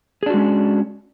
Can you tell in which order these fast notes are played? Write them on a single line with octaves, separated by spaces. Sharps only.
G#4 D4 F#4 G#3 C#4